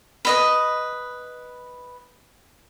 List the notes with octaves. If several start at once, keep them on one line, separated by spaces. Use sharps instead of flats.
B4 D#5 B5